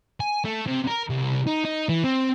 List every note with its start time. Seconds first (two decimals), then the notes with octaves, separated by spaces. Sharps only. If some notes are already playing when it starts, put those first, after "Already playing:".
0.20 G#5
0.45 A3
0.67 C3
0.88 A#4
1.10 C2
1.47 D#4
1.65 D#4
1.89 E3
2.04 C4